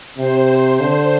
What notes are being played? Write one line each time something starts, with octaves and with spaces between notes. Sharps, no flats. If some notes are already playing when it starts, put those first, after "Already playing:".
C3 C5
D3